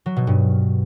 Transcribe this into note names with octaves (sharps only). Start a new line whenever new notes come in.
F#3
B2
G2